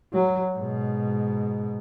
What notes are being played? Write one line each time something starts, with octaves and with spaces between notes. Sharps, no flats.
F#3
G#2 B2